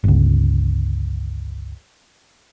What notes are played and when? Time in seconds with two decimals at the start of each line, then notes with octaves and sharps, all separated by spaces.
0.04 G1 C#2